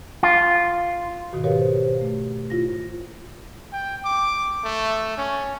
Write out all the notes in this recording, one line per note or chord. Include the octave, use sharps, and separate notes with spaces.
F4
G#2 B2 D#3 F#4
F#4 G4 A#4 B4 C#5 F5
C5
A3
E4 F4 A#6
G5
D6
A3
C#4